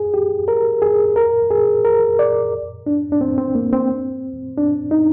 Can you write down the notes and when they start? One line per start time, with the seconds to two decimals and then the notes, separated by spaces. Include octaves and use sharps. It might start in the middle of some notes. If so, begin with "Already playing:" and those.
Already playing: G#4
0.14 G4
0.48 A#4
0.82 G#4
1.16 A#4
1.51 G#4
1.85 A#4
2.19 D5
2.86 D4
3.12 D4
3.21 C4
3.38 C4
3.55 A#3
3.72 C4
4.57 D4
4.91 D#4